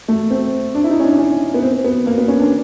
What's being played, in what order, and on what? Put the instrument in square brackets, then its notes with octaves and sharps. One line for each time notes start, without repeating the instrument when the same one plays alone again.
[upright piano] A3
C4
D4
E4
D#4
C#4
D4
C#4
B3
C4
B3
A#3
B3
C#4
D4